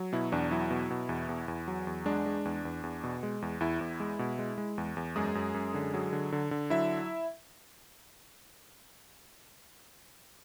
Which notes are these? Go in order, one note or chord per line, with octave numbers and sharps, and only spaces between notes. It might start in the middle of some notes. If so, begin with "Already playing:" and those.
Already playing: F#3
B2 E4
E2 D4
F#3 E4
B2
B2
E2
E2
E2
F#3
E2
G#3 D4
G#3
E2
E2
E2
B2
G#3
E2
E2 E4
E2
G#3
B2
G#3
G#3
E2
E2
F#2 G#3 G#4
F#2
F#2
D3
F#3
D3
D3
D3
F#3 E4 E5